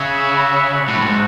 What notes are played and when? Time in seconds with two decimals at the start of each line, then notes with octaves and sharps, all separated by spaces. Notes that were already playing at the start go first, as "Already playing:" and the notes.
Already playing: C#3 F#4 C#5 E5
0.74 A3 D4 F#4
0.88 A2
0.97 F#2
1.02 G#2